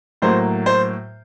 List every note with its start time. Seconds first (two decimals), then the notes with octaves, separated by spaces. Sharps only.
0.22 A2 F#3 A#3 C5
0.66 C5